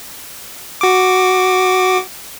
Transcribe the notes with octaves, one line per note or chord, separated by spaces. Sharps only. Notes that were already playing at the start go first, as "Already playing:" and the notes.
F#4 D6